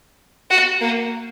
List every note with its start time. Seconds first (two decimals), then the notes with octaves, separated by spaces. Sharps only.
0.50 F#4
0.80 A#3